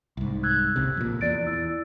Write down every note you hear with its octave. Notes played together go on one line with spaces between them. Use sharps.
C2 G#2
E6 F#6 G#6
E1 C2 C3
F2 A#2
E2 D5 A6 D7
E4 E6